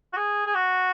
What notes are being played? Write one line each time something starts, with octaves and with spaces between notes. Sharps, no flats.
F#4
G#4
G#4
F#4